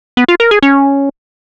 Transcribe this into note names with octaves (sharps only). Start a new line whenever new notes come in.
B3
F4
A#4
G#4
C#4